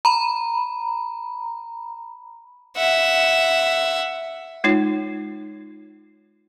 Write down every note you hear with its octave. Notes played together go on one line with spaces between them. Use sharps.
A#5 B5
E5 F#5
G#3 D#4 F4 C#5